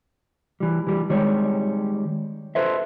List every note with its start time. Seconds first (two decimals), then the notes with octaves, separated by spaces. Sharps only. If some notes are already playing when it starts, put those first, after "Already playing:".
0.60 E3 G3
0.87 E3 G3
1.10 D#3 G3 G#3 G4 C#5
2.55 A4 B4 C5 E5